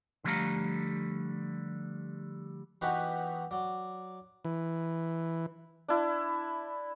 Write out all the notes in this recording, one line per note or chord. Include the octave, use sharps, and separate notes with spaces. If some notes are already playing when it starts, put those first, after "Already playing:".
D3 F3 G3 A3 F5 A#5
E3 B3 D#4 F#4 G4 B4
F#3 D5
E3
D4 E4